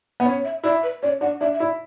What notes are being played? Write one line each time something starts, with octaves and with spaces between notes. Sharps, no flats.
B3
C#4 C#5
E5
E4 D5
B4
C#4 D5
D4 F#5
D4 E5
E5
E4 D5